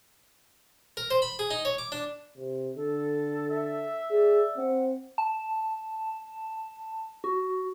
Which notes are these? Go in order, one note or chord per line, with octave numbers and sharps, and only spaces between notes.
A#4
C5
B5
G#4
D#4
C#5
D6
D4
C3
D3 A4
E5
G#4 D5
C4 F#5
A5
F#4